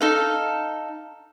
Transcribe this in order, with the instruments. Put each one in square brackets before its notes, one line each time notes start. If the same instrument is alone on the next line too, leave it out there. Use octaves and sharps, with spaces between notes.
[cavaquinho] D#4 A4 F5